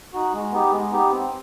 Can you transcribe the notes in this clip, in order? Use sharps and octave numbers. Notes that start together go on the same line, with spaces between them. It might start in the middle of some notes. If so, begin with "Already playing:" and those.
D#4 F#4
G#3
B3 D#4 G4
G#3
B3 D#4 G4
C4